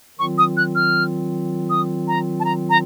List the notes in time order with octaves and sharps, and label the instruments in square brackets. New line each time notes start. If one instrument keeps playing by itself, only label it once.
[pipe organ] D#3 F#3 C4 F4 [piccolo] C#6
[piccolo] D#6
F#6
F6
D#6
A#5
A5
A#5
A#5